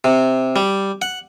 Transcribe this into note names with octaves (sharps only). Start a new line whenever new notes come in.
C3
G3
F#5